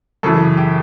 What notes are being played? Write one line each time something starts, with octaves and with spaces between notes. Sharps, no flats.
F#2 C#3 E3 A4
G4